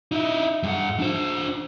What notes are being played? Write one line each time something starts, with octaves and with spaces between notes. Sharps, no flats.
D#4 E4
G2 F#5
D4 C5